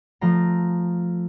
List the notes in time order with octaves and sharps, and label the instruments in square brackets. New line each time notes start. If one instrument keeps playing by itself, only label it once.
[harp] F3 A3 F5 A#5